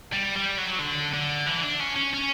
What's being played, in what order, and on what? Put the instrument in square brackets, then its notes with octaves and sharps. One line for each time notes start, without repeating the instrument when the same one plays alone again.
[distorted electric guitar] G3
G3
F#3
D3
D3
E3
D4
C#4
C#4
C#4